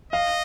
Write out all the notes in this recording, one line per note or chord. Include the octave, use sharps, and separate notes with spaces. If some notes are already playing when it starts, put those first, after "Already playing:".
D#5 F5